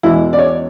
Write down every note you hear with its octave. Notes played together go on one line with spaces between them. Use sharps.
E2 B2 G#3 E4
D5
C#5